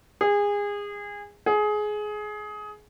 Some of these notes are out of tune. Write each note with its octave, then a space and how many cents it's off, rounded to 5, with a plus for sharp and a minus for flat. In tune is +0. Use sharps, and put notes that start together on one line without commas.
G#4 -25
G#4 +20